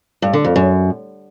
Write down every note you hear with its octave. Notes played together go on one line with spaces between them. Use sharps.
G2
D3
F2
F#2